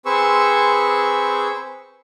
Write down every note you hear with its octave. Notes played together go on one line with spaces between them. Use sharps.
C4 G#4 B4 C5 C#6 E6